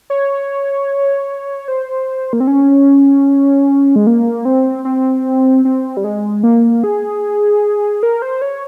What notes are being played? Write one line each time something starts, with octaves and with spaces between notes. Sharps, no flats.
C#5
C5
A#3
C4
C#4
G#3
A#3
C4
C4
C4
G3
G#3
A#3
G#4
A#4
C5
C#5